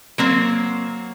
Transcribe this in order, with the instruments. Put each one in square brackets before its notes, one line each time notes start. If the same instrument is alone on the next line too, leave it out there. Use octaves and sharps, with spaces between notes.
[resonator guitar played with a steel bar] F#3 A#3 C4